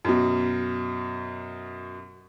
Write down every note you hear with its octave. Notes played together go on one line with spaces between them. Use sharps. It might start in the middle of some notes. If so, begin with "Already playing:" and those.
F#2 B2